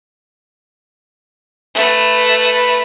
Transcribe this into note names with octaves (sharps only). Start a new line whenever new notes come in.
A3 B4